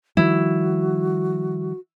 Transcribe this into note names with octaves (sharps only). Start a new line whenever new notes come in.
D#3 F3 G3 E4 F#4